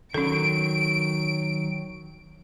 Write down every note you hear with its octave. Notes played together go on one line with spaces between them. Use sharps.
D#3 F#3 C#4 A4 D7